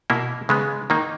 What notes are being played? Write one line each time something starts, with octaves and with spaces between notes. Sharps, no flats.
B2 A#3 E4
C#3 G#3 B3
D#3 A#3 D#4